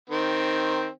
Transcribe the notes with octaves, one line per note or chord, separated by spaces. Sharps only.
D#3 C4